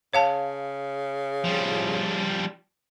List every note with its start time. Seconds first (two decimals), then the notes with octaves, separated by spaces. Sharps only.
0.13 C#3 C#5 F5 A5
1.44 F3 G3